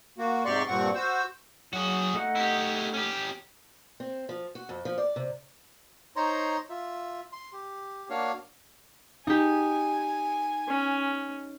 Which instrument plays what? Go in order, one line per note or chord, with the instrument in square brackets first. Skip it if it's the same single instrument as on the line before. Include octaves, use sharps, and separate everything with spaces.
[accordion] A#3 F#4
G#2 C3 G4 D5 C6 C#6
G2 A#2 C4 F#5 C#6
F#4 C5 E6
[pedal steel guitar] F#3 [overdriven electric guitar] F#4 G#4
[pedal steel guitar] A3 D#4 F#5
[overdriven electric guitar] E4 G4
C#4 G4
[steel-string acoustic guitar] C4
F3
F#4
F2
F3
D5
C3
[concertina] D#4 C5 C#5 A#5 C6
F4 E5
C6
G4
A#3 D4 F#4 C#5 F5
[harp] D#4 G4 [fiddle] G#5
[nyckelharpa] C#4